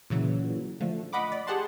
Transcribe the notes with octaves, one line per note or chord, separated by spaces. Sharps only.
A#2 C#3 E3 F#3
D3 F3 A3
D#5 F#5 B5 D6
D5
G4 G#4 F#5 A5 C6